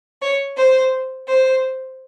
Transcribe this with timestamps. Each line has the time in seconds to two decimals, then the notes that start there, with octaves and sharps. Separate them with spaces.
0.21 C#5
0.57 C5
1.27 C5